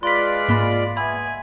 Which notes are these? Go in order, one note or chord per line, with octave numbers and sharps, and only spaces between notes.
G#3 F4 B4 D5 C6 B6
G#2 A#3 B5
B3 E5 G#5 B5